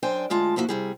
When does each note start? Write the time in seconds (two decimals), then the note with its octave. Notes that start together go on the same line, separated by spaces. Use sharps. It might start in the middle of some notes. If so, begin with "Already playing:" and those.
0.03 F#2 D4 C5 G5 G#5
0.30 D2 G#3 F4 A5
0.56 F3 A#3 E4 F#4
0.69 C3 G3 G#4